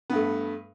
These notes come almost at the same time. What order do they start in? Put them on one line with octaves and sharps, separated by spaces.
B3 G2 A3